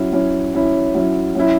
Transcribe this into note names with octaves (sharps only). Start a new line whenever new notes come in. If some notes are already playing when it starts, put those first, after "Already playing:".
Already playing: F#3 C#4 E4
F#3 C#4 E4
F#3 C#4 E4
F#3 C#4 E4
F#3 C#4 E4